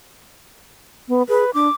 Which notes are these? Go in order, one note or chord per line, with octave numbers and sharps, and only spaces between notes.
B3
G#4 B4
D4 D6